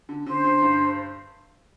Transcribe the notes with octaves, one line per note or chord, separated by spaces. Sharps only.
D3
D3 C5
D3
G2